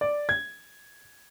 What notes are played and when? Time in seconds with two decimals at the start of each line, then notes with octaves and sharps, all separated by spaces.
0.01 D5
0.29 G#6